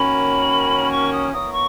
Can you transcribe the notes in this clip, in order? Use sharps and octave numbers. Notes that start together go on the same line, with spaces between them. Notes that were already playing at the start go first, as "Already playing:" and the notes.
Already playing: D#3 A#3 C#4 F#4 B5
C#6
D#6
B3 E4 A#4 C#5 D#6
C#6